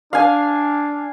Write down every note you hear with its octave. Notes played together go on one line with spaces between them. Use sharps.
D4 F5 G#5